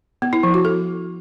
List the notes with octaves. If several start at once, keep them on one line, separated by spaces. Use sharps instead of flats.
B3
E4
F3
F#4
A4